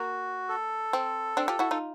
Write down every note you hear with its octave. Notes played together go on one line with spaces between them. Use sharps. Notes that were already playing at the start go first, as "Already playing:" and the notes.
Already playing: A#3 F#4
A4
C4
C4 D4
F4 G4
E4 F#4
D#4 F4